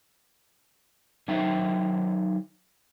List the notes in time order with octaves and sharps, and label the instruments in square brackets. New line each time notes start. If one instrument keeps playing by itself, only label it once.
[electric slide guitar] D#3 F#3 D#4 C5 E5 G5